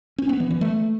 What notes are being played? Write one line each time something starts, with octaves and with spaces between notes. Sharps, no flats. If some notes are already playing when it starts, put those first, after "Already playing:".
C#4
B3
E3
E3
A3